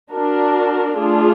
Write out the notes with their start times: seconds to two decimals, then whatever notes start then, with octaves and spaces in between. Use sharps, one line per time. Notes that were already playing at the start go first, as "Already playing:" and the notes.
0.11 D4 F#4 A#4
0.96 A3 D4 F4 G#4